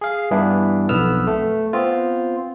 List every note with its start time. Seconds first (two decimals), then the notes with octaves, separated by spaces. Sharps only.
0.01 G#4 F5
0.31 G2 E3 B3 D4 E4
0.89 B1 F2 B3 B4 E6 F6
1.27 A3
1.73 B3 C4 F4